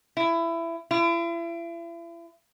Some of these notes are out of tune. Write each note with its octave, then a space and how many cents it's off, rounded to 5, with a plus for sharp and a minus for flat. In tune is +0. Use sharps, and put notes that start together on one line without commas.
E4 +20
E4 +40